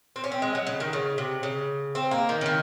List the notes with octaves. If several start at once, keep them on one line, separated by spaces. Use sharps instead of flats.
C4
C#4
C4
G#3
F#3
C#3
D#3
C#3
C3
C#3
C4
A#3
D#3
C#3
D#3